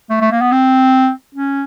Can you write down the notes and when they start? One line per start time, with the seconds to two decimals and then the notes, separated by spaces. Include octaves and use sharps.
0.10 A3
0.21 A3
0.31 A#3
0.41 B3
0.52 C4
1.35 C#4